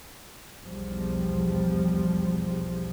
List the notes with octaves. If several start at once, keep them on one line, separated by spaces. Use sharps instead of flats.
B1 E2 F3 G3